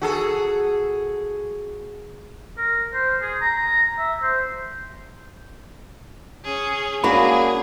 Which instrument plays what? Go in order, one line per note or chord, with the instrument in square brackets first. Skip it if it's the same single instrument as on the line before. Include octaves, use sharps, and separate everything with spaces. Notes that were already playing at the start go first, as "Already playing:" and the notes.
[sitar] F#4 G#4 A4
[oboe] A#4
C5
G#4
A#5
E5
C5
[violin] C#4 G#4
[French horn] A#3 [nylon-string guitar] C#4 D4 F#4 [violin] G#4 [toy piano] B5